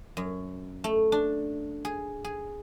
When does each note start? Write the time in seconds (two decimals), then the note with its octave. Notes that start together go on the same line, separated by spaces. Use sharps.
0.17 F#2
0.84 A3
1.12 D4
1.85 G#4
2.24 G#4